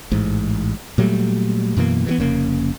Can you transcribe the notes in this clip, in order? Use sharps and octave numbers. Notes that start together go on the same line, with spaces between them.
A1 G#2
A#2 F#3 G3 A3
F#2 B2 E3 A#3
E3 F#3 B3
F1 C#3 A#3